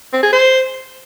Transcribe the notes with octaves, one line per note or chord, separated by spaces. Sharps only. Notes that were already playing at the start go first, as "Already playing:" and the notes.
C4
G#4
C5